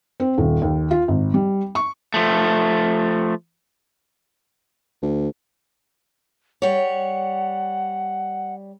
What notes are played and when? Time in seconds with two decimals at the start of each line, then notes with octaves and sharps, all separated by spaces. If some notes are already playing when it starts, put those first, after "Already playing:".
0.20 C4
0.38 D#1
0.62 D#2
0.91 F4
1.08 G#1
1.34 G3
1.75 C#6
2.14 F3 A3
5.02 D2
6.62 G3 C#5 F#5